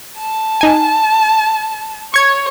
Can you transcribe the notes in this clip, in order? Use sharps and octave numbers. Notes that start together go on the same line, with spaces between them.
A5
D#4 G#5
C#5 C#6 G#6